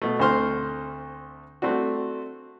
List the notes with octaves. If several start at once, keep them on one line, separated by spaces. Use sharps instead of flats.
B2 A3
D2 A3 C4 C5 C6 F6
A3 C4 D4 F#4